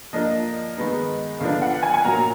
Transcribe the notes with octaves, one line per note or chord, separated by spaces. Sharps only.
F3 A#3 D4 D#5
D#3 G#3 B3 D#4
D3 F3 B3 D4 F5
F#5
G#5
G#5
A#2 F#3 A#3 A#5